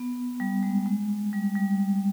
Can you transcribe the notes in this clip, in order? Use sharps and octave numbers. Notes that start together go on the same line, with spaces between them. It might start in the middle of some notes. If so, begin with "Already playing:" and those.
Already playing: B3
G3
G#3
G#3
G3
G3